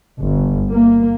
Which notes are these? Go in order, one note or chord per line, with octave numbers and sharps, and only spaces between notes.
G1
A#3